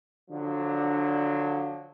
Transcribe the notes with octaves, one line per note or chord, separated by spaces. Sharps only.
D3 F3 F#3 D4